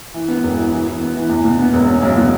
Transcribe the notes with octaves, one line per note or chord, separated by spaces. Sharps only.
E3
B3
E1
E3
E3
E3
B3
E3
E2
B2
B3
E1
C#4
B1
B2